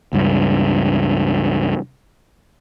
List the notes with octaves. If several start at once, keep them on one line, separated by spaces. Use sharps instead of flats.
C#2 G2